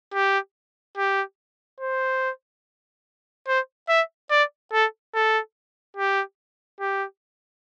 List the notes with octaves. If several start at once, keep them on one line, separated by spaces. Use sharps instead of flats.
G4
G4
C5
C5
E5
D5
A4
A4
G4
G4